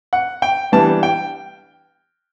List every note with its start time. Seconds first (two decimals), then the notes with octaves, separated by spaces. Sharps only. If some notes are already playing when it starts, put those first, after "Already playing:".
0.13 F#5
0.42 G5
0.72 E3 G3 B3 D4 A5
1.03 G5